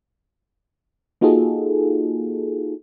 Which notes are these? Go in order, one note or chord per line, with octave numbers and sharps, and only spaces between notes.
A#3 D#4 F4 F#4 G#4 A4